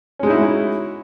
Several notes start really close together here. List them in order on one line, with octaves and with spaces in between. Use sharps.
C#4 G#3 D#4 E4 F#4